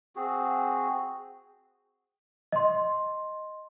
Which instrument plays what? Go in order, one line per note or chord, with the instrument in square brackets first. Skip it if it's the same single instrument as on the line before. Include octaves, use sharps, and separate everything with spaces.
[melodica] C4 F#4 G#4
[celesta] D#5 C6